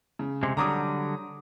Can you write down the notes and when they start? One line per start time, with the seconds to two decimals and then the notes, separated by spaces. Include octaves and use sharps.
0.19 C#3
0.43 C3 G#3
0.57 D3 F#3 G3 A#5 D6 D#6